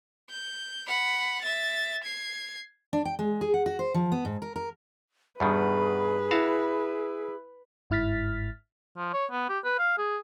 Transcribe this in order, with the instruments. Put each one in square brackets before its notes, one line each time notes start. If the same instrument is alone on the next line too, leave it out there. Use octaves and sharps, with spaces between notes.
[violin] G6
F#5 B5
E5 A6
G#6 C7
[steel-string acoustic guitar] D4
G5
G#3
G#4
F#5
F#4
C5
F3
B3
G#2
A#4
A#4
[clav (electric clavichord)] E2 B2 D#3 [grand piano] G2 [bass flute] G#4 [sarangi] B4
[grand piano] E4 [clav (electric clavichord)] F#4 F5 A5
[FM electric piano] G1 G#2 E4 F6 A6 B6
[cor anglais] F3
C#5
B3
G4
B4
F5
G#4